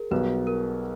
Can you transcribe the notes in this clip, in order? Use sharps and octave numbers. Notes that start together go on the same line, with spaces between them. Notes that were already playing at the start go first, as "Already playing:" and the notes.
Already playing: G#4 A#4
B1 B2 G3 B4
A#4